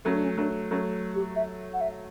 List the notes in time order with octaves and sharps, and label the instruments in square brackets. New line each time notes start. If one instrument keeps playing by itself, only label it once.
[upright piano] F#3 A3 [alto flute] C#4
[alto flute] D4
C#4
[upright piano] F#3 A3 [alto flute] D4
[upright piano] F#3 A3 [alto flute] C#4
[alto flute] G4
E5
F#5
E5